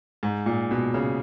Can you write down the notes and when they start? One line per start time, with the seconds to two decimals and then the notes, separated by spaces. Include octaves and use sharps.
0.23 G#2
0.46 A#2
0.71 B2
0.94 C#3